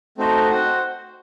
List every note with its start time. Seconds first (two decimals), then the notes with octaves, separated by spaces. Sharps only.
0.18 A3 C4 D#4 F#4 C5
0.50 F#4 C5 F#5